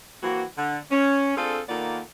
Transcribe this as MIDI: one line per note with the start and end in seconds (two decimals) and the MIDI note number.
0.22 0.43 52
0.22 0.43 58
0.22 0.43 60
0.22 0.43 66
0.56 0.78 50
0.91 1.35 61
1.36 1.60 60
1.36 1.60 62
1.36 1.60 65
1.36 1.60 68
1.36 1.60 69
1.68 1.99 51
1.68 1.99 58
1.68 1.99 59
1.68 1.99 65
1.68 1.99 69
1.68 1.99 74